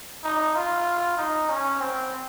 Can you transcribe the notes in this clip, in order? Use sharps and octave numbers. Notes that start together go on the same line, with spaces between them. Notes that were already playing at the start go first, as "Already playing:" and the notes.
D#4
F4
D#4
C#4
C4